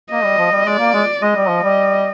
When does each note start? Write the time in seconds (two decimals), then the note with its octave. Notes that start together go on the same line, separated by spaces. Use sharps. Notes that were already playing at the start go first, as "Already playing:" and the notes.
0.11 A#3 D#5
0.24 G3
0.38 F3
0.52 G3
0.65 G#3 D5
0.79 A#3
0.94 G#3
1.22 G#3 D#5
1.36 G3
1.49 F3
1.63 G3